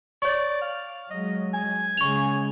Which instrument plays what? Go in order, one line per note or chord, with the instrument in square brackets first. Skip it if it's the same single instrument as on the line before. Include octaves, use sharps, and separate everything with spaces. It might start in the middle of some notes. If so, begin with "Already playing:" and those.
[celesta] C#5 C#6 [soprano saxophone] D5
[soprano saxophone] F5
[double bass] F#3 G#3 [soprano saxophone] D#5
[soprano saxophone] G#5
[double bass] C#3 G#3 [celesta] C#6 F7